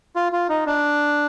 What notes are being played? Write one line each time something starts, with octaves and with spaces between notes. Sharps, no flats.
F4
F4
D#4
D4